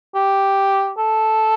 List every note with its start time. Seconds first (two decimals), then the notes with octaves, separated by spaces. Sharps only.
0.15 G4
0.98 A4